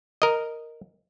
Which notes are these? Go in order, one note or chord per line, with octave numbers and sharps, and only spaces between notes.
A#4 D#5